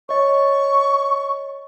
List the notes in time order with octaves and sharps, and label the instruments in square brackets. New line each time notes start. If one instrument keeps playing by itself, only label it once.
[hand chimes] C#5 D#5 [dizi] C#6